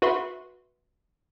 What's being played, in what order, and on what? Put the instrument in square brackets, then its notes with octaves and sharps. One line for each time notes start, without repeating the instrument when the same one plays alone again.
[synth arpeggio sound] F#4 B4 E5 C6 C#6